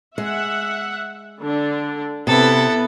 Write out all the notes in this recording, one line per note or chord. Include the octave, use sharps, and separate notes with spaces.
G#3 E5 F#5
D3 D4
C3 B3 E4 A4